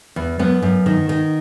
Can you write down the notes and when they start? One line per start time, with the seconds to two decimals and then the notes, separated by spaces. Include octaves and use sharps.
0.16 E2
0.39 F#2 B3
0.63 F#2
0.86 D#3
1.09 D#3